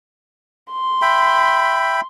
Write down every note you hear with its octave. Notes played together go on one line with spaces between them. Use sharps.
C6
E5 G5 B5